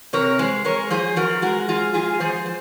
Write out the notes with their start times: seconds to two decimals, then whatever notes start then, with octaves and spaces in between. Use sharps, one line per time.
0.13 C3 A#4 C#5
0.39 G#3 G#4 C5
0.65 G#3 A#4 C#5
0.90 F3 G#4 C5
1.16 F3 F#4 A#4
1.42 G#3 F#4 A#4
1.68 F3 F4 G#4
1.94 G#3 F4 G#4
2.20 F3 G#4 C5
2.46 C5